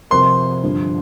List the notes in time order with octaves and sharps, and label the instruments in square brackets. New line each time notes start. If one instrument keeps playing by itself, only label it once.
[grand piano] C3 F3 C4 A#4 [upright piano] C6
[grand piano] G2 D3 F3